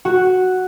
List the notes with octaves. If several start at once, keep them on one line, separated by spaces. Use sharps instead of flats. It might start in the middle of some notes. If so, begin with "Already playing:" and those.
F#4